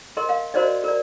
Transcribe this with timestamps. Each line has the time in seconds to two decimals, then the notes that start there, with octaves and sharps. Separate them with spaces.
0.17 A#4 D#5 C6
0.29 F5
0.54 F#4 A#4 C5 D5 D#5
0.84 A#4 D5